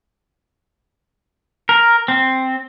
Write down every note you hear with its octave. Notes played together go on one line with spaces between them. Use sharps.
A#4
C4